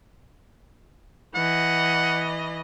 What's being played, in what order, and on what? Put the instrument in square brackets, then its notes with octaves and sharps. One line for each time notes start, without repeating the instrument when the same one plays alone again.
[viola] E3 D#5 [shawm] F#5